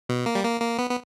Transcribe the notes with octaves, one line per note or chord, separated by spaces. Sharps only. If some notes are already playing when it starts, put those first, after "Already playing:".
B2
A#3
G3
A#3
A#3
B3
B3